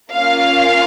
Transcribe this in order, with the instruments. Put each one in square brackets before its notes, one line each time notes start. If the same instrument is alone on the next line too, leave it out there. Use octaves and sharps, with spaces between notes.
[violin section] A#3 C#4 F4 F5